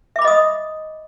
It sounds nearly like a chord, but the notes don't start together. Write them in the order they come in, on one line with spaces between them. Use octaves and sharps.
E5 D6 B5 D#5 D#6